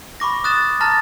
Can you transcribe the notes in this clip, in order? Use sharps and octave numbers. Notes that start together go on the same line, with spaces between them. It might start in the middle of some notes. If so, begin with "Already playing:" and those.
B5 C#6 D6 A#6
D#6 F#6 A6 E7
A5 A#5 F6 A6 A#6